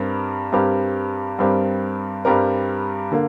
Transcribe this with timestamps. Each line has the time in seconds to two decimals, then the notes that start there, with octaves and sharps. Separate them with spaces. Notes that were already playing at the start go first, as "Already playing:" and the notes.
Already playing: G2 G3 C4 G4 A#4
0.52 G2 G3 C4 G4 A#4
1.39 G2 G3 C4 G4 A#4
2.25 G2 G3 C4 G4 A#4
3.12 D3 A#3